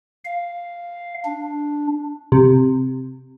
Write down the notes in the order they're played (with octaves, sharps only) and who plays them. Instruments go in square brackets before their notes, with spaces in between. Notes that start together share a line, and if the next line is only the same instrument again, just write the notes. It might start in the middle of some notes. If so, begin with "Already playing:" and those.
[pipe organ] F5
D4
[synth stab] C3